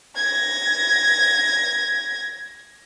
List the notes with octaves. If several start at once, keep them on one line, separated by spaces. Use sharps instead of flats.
G#6 A#6